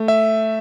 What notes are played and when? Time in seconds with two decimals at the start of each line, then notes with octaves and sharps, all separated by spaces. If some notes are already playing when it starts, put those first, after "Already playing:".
Already playing: A3
0.08 E5